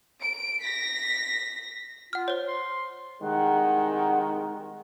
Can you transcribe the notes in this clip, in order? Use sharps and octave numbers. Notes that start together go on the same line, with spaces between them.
D7
A#6 B6
F4 F#5 F6
C5 C#5
C6
C2 D#3 G#3 F#5